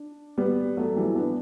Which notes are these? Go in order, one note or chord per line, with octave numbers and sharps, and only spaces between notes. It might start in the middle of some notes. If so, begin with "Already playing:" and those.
Already playing: D4
G3 B3
F#3 A3
E3 G3
B3 D4